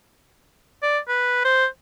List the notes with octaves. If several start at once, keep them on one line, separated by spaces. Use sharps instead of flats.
D5
B4
C5